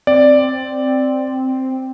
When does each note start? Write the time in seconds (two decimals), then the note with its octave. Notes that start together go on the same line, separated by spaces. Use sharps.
0.07 C4 D5